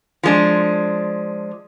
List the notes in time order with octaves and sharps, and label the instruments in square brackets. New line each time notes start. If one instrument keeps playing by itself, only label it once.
[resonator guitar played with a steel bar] F3 G#3 D4